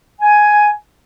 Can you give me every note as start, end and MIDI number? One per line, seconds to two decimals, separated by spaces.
0.22 0.71 80